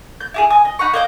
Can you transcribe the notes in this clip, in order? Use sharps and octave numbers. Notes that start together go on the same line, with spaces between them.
G6
E4 G4 G#4
G#5 D#6
D#5
D#4 F#5 B5 C#6
A#3 D#5 G5